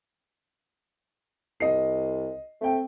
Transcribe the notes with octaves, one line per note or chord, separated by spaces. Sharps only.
C2 D#5 C7
A3 C4 G5